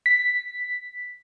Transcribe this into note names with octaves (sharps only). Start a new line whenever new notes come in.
B6